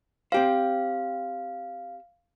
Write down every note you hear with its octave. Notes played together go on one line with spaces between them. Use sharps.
C4 G4 C5 F5